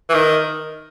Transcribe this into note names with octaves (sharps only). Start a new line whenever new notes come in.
E3
D#3